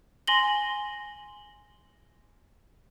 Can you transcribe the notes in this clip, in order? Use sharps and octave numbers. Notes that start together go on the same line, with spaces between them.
G#5 C6 A#6 F#7 G7